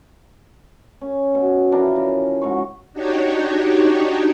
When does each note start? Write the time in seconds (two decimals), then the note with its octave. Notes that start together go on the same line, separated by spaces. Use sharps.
1.01 C#4
1.34 B2
1.72 E3 F3 D4 A#4
1.96 C#3
2.41 G#2 F#4 C#6
2.93 D4 D#4 F#4 G4 C#5